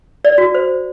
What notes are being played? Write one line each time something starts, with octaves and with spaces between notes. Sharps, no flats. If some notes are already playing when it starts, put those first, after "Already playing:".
D5
F#4
C5